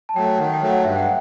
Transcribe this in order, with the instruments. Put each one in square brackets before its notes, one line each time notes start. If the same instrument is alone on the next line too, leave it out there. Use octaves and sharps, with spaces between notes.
[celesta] A5
[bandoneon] F#3 A3 [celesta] G5
[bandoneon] D#3 [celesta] F#5
[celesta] G5
[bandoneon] F#3 A3
[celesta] F#5
[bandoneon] G2 [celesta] E5
[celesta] G5
F#5